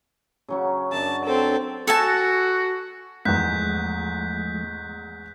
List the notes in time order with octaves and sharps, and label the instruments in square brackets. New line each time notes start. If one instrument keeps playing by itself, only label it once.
[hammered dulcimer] C#3 F#3 C#4
[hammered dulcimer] F#2 D4 [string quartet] A5
[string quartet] C4 A4
[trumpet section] F#4 [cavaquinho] A4 G#5 A5
[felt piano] E2 G#2 [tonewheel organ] F3 G#3 A3 [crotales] F#6 G6 B6